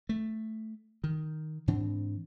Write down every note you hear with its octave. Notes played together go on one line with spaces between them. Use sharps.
A3
D#3
G#2 E3 C4 D4